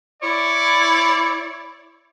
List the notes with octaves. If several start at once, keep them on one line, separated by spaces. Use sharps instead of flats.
E4 C#5 D5